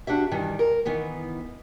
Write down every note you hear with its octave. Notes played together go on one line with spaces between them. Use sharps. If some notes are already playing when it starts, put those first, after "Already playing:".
D4 F#4 G4 E5
G2 D#3 E3
A#4
D#3 E3 B3